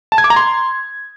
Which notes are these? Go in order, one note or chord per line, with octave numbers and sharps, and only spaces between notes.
A5
G#6
D6
A#5
C6